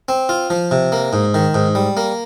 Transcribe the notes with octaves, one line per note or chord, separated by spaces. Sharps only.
C4
F4
F3
C3
A#3
G#2
D#3
G#2
G3
A#3